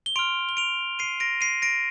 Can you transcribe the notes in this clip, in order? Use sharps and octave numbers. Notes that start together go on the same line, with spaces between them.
G7
C6 F6 D7 F7
G7
D7 F7
C7 D#7
A#6 D7
C7 D#7
A#6 D7